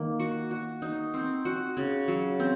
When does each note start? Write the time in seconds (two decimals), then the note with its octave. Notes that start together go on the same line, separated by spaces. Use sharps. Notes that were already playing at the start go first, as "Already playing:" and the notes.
Already playing: D#3 A#3
0.19 F#4
0.51 F#4
0.82 D#4
1.14 C4
1.45 F#4
1.77 C#3
2.08 F#3
2.40 C4